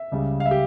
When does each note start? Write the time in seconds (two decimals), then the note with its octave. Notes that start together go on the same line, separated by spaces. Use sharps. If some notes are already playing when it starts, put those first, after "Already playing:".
Already playing: E5
0.12 C#2 C#3 G3
0.40 F5
0.46 E5
0.51 G4